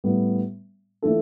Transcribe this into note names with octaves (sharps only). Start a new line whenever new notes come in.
A2 G3 B3
E3 A3 D4 F4 A4